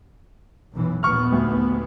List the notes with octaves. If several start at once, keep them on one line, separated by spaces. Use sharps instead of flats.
B1 F#2 E3
A#1 D#2 B3 C#6 F6
D2